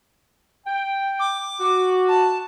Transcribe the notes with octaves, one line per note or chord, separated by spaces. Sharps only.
G5
D6
F#4
A5